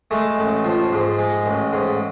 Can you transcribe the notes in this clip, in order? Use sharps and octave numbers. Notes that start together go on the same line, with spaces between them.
G#3 A3
A1
F3
G#2
G#3
A1
G#2